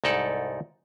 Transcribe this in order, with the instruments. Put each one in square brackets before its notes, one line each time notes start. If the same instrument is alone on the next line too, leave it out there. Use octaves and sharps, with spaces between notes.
[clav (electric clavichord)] C2 G#2 D#4 A4 D5